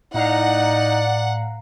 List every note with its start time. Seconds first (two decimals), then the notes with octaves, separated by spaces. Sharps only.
0.14 A2 D#4 D5 F5 F#5 A#5